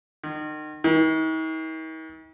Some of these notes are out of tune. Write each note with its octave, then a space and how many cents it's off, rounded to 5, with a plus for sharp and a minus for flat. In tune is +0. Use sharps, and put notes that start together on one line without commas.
D#3 -35
D#3 +45